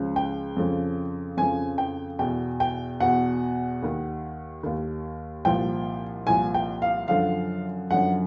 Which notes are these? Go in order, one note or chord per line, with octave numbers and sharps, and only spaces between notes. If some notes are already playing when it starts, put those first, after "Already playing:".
Already playing: C#2 C#3 F3
G5
F2 C#3 F3
F2 C#3 F3 G#5
G5
E2 B2 G5
G5
E2 B2 F#5
D#2 D#3
D#2 D#3
C2 A#2 F3 G5
C2 A#2 F3 G#5
G5
F5
F#2 D3 F3 F5
F#2 D3 F3 F#5